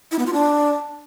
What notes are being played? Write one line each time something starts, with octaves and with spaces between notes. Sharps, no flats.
E4
B3
F4
D4